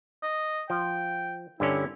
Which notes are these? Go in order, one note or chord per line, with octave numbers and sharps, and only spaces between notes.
D#5
F3 G5
G2 D3 C#4 E4